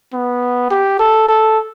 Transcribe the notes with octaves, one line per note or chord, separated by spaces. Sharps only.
B3
G4
A4
A4